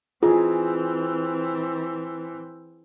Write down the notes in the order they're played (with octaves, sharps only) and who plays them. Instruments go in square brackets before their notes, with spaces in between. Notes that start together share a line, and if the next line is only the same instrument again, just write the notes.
[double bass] E3 C4 [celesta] F4 [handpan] G#4